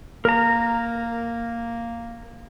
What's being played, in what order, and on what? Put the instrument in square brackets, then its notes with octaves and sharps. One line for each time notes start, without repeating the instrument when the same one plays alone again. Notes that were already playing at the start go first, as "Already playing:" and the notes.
[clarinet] A#3 [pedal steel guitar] A#4 A#5